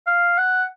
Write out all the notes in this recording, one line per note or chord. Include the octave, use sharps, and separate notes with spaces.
F5
F#5